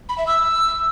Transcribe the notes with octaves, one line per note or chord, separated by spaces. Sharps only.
B5
E5
E6